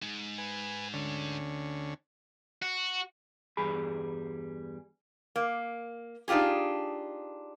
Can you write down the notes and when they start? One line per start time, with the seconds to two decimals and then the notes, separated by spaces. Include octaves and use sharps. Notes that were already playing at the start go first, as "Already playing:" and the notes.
0.02 G#2
0.38 B4 G#5
0.94 D2 D3 C#4
2.62 F#4
3.57 E2 G2 G3 G#4 B5
5.36 A#3
6.28 D4 D#4 F4 G4 G#4